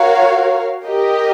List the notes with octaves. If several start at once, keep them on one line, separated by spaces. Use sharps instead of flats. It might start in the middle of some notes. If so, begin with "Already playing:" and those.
Already playing: F#4 A#4 C#5 F5
G4 A#4 D#5